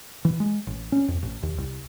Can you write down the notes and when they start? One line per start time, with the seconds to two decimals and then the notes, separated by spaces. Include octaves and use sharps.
0.25 E3
0.40 G#3
0.67 A1
0.92 C#4
1.08 F2
1.23 A1
1.43 D#2
1.58 C2